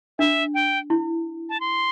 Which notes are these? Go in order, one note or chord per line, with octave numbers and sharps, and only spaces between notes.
D4 E5
G5
E4
A5
C6